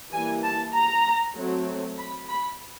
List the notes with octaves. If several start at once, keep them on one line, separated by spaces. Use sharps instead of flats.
E3 G3 A#3 G#5
A5
A#5
F#3 A3 C4
B5
B5